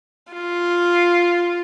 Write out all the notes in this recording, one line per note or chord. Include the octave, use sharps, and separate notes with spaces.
F4